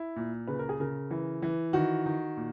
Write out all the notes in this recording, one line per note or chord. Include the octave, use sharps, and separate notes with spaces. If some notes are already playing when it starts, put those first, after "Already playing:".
Already playing: E4
A#2
C#3 B4
A#4
G#4
C#3 A#4
E3
E3
D#3 F#4
D#3
A#2